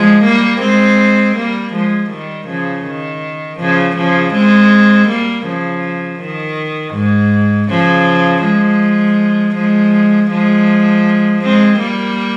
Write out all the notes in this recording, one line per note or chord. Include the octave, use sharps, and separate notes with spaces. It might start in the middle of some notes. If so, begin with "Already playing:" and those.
Already playing: F3 G#3
G3 A#3
G#3 C4
G3 A#3
F3 G#3
D#3 G3
C#3 F3
D#3
C#3 F3
C#3 F3
G#3 C4
G3 A#3
C#3 F3
D#3
G#2
C#3 F3
F3 G#3
F3 G#3
F3 G#3
G#3 C4
G3 A#3